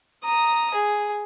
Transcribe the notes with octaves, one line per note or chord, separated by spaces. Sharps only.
A#5 D#6
G#4